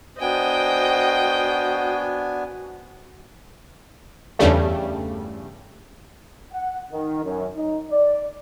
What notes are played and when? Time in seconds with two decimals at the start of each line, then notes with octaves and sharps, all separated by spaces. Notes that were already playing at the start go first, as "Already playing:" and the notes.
0.21 B3 D4 F#4 C5 D#5 G5 G#5
4.39 E2 G2 C#3 G3 A3
6.53 F#5
6.92 D#3
7.25 F#2
7.57 D#4
7.91 D5